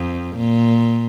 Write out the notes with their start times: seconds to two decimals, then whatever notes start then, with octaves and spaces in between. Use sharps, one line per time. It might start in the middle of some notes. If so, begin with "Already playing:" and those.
Already playing: F2
0.36 A#2